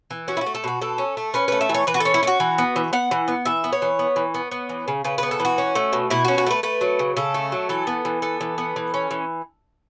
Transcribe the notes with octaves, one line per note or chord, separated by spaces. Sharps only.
E3
C#4 F#4
E4
F#4
A3
A4
B2 F#4
B2 A4
C#4
A3
C#4 B4
A3 B4
E5
E3
C#5
E3 B4
F#4
A4
C#4
E4
A3
F#4
E3
B3
E3
B3 F#5
E3
B3
E3 E5
B3
C#5
E3
B3
E3
B3
B3
E3
C#3
C#3 B4
B3 B4
A4
E3
F#4
C#4
A3
B2
B2 E4
C#4 F#4
F#4
A3 B4
A3 B4
F#3
C#3
C#3 A4
A3
F#3
E3 A4
B3
E3
B3 A4
E3
B3
E3
C#4
E3